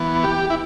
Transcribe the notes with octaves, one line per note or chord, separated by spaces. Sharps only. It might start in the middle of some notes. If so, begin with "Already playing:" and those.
Already playing: E3 B3
G4
E4